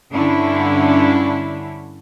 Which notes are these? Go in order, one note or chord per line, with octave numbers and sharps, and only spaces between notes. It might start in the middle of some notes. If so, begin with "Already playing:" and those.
G2 D3 C#4 D4 E4